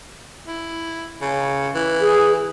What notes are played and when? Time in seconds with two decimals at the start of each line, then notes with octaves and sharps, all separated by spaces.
0.47 E4
1.22 C#3
1.75 E3
2.01 G#4